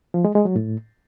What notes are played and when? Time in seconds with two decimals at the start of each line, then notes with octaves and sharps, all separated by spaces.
0.14 F3
0.25 G#3
0.35 G#3
0.45 F#3
0.56 A2